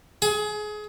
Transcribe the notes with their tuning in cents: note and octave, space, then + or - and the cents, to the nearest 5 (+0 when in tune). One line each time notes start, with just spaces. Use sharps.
G#4 +25